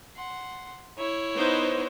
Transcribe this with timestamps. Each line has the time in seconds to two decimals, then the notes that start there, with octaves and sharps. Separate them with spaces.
0.16 F#5 C6
0.98 E4 C#5
1.36 B3 D#4 C5